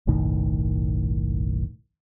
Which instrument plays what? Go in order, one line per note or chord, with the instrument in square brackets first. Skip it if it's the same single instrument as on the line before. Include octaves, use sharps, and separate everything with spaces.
[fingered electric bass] F#1 B1 A2 D#3